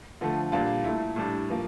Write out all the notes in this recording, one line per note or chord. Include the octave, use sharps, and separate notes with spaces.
D3 F3 A3
A#2 G3 D4 F4
A#2 A3 E4
A2 G3 D4
F3 A#3